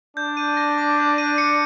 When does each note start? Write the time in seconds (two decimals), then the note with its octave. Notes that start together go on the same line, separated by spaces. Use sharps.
0.17 D4 G6
0.37 D#7
0.57 A#6
0.78 D6
0.98 G6
1.18 D#7
1.38 C#7